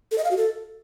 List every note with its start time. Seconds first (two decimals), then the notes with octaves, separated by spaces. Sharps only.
0.11 A4
0.18 D#5
0.24 F5
0.31 F#4
0.37 A4